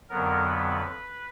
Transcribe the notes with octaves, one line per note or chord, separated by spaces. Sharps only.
F2 D3 F#3 B3 A#4
B4